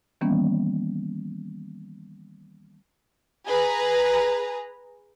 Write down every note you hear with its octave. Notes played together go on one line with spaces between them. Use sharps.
D#3 E3 G3 A#3 B3 C#4
G#4 B4 A#5